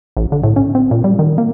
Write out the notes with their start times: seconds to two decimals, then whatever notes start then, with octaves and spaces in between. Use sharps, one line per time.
0.17 A1
0.32 D3
0.43 A2
0.56 C#4
0.75 C4
0.91 A#2
1.04 G3
1.19 D#3
1.38 A#3